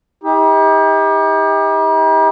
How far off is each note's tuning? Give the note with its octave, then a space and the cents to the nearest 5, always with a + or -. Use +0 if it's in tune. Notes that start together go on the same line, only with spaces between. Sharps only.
D#4 +45 G4 +30